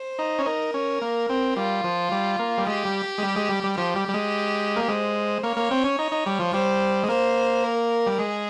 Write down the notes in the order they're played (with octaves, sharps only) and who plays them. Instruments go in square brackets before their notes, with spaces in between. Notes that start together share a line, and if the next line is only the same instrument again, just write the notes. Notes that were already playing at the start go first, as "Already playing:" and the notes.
Already playing: [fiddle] C5
[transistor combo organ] D#4
C#4
[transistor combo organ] D#4 [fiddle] A#4
[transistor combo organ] C#4
A#3
C4
[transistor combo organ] G3 [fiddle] F4
[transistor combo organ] F3
G3
A#3
G3
[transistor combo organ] G#3 [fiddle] G4
[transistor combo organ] G3
G#3
G3
G#3
G3
G3
[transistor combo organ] F3 [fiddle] G4
[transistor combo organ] G3
G3
G#3
A#3
[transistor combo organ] G#3 [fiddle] C5
[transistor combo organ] A#3 [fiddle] C#5
[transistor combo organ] A#3
C4
C#4
D#4
D#4
G3
F3
[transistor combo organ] G3 [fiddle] C5
[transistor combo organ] G#3
[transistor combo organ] A#3 [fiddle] C5
[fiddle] A#4
[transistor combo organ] G3
[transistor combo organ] G#3 [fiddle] G#4